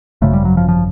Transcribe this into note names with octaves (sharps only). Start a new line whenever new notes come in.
G#1 F#2 C#3 A3
G3
F#3
F3
F3